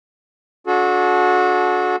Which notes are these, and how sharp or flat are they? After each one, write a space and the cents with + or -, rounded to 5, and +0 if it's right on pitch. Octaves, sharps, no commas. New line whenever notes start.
D4 -35 F#4 -25 A4 -35